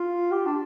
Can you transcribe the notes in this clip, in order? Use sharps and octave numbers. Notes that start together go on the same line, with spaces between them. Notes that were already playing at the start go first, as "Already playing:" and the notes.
Already playing: F4
G4
D4